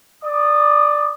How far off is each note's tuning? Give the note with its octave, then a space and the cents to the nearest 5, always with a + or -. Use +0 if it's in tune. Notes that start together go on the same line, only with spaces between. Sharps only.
D5 +5 D#6 -20